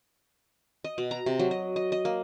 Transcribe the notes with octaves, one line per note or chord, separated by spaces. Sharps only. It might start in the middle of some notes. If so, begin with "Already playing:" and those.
D#5
B2
A#5
C3
F#3
D#5
D#5
D#5
A#3